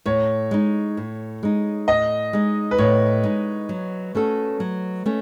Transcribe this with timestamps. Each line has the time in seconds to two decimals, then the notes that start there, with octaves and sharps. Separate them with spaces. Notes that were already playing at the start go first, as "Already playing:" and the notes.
0.05 A2 C#5
0.51 G#3 D#4
0.97 A2
1.43 G#3 D#4
1.88 A2 D#5
2.33 G#3 D#4
2.71 B4
2.78 A2 C#5
3.24 G#3 D#4
3.69 F#3
4.15 A3 C#4 F#4 A4
4.60 F#3
5.06 A3 C#4